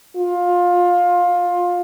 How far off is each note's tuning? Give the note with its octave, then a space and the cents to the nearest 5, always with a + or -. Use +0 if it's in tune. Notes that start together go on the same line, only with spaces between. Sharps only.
F4 +20